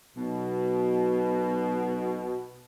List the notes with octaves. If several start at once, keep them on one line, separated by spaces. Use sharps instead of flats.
B1 B2